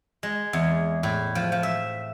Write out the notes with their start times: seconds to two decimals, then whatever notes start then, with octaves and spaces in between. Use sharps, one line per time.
0.23 G#3
0.53 E2
1.03 A2
1.35 F3
1.52 F3
1.63 E5